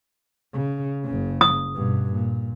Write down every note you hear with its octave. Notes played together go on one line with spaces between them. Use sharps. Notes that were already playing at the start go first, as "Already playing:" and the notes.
C#3
F#1 C#3
D#6
G2 B2
A#2